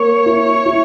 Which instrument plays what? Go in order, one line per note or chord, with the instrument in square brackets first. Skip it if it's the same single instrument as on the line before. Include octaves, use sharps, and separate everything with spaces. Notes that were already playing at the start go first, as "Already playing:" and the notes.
Already playing: [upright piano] A#3 [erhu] C#5
[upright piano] E4
E4